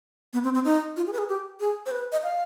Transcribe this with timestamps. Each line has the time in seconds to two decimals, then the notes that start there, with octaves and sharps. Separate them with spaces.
0.33 B3
0.44 C4
0.54 C4
0.65 D#4
0.97 F4
1.07 G#4
1.13 B4
1.18 G#4
1.29 G4
1.60 G#4
1.86 C5
1.91 B4
2.12 D#5
2.23 F5